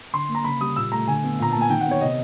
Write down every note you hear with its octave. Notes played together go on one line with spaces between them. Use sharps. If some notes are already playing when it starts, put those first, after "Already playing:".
D3 C6
A#3
A#5
C#3 B5
G3 D#6
A#2 E6
A3 A#5
D3 G#5
B3
A#2 A#5
A#3 A5
G#5
D#3 G5
F#5
B3 C#5
C3 D#5